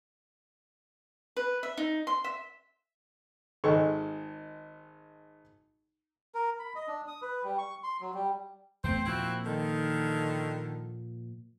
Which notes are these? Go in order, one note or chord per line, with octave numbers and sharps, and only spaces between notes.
B4
E5
D#4
C6
E5
G#1 G#3 A4 C#6
A#4
B5
D#5
D4
D#6
B4
G3
C#6
C6
F#3
G3
E2 A3 C4 C5
A#2 F3 A#3 C4 E4 F#4
D3 D#3